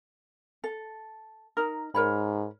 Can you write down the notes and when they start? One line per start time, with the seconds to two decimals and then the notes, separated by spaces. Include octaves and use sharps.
0.64 A4
1.57 D#4 A#4
1.95 G#2 A#4 C#5 B5